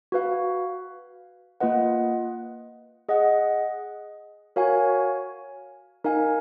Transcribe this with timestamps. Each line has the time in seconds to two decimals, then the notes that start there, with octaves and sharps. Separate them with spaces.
0.12 F#4 B4 F5
1.60 A#3 F4 B4 D#5 F#5
3.09 G#4 D#5 F#5
4.56 F#4 A#4 C#5 F5 G#5
6.04 D#4 A#4 F5 G#5